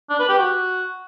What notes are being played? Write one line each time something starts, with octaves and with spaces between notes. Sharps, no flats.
D4
B4
G4
F#4